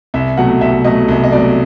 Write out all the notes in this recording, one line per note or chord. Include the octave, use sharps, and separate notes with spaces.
C2 E5
B2 F#3 A3 F#5
C2 E5
B2 F#3 A3 D#5
C2
D#5
B2 F#3 A3 D5